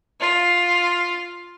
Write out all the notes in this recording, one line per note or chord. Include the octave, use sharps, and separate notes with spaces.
F4